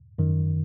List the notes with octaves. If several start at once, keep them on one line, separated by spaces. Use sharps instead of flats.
F#2 D#3